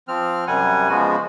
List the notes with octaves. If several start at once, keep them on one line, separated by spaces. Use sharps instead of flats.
F3 C4 F6
F#2 C3 G3 F#5 G#5
C#3 F3 G#3 B3 F#4